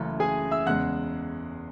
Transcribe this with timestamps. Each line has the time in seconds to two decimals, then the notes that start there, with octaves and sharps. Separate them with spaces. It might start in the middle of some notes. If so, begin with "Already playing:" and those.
Already playing: F#1 F#2 E3 A3 A4 A5
0.20 G#4 G#5
0.51 E5 E6
0.66 E2 C#3 G#3 F#5 F#6